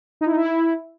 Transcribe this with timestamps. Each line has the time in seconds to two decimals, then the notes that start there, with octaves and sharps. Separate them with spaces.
0.21 D#4
0.26 E4
0.31 D#4
0.37 E4